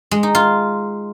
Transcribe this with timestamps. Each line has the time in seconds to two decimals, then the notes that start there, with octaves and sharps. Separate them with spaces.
0.11 G#3
0.23 D#4
0.35 F4